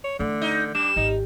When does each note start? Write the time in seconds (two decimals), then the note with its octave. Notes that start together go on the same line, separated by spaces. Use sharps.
0.04 C#5
0.19 D3 E3 A3
0.42 D#4
0.75 G3 D4 E7
0.96 G#1 D#4